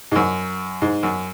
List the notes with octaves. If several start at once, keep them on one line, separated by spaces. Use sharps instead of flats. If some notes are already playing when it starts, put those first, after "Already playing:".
G#2
F#2
G#2
F#2